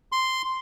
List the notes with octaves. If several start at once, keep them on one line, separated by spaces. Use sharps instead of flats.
C6